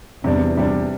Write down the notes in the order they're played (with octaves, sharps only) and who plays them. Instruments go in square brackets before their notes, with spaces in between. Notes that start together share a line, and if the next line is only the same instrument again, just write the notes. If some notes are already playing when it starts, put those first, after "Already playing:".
[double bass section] E2 [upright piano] C3 G3 D4
[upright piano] C3 G3 D4